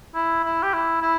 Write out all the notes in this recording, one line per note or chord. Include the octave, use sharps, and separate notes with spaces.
E4
E4
G4
E4
E4